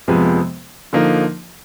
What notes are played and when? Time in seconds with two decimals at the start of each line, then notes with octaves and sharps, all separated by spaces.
0.08 F2 C3 F3 G#3 B3
0.93 D3 F3 A#3 D#4